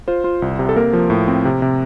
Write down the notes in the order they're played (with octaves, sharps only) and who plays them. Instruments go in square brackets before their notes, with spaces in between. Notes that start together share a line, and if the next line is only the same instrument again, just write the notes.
[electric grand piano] F4 C5
F4
C2
C3
A4
A#3 A#4
F3
A2
C4
C3
C3